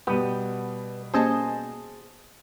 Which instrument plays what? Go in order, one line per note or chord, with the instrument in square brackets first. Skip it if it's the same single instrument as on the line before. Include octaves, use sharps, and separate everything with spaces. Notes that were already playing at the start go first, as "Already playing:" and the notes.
[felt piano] B2 G3 [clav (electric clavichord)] B3 [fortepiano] G4
[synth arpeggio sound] A#3 C#4 G4 [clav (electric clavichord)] G#4 [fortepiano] C5 D#5 A5